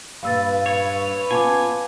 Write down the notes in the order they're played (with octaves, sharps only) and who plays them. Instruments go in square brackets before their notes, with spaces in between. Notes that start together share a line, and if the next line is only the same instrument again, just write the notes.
[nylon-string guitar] G2 A#2 G3 [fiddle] B4 [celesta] F5 E6 A6
[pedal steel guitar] C#5
[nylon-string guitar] B3 C#4 F4 [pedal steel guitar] G#5 [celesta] A5 D6